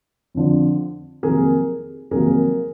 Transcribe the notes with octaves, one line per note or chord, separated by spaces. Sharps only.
F2 D3 F3
F2 C3 D#3 F#3 A#3 G#4 A#4
F2 C3 D#3 F#3 A#3 G#4 A#4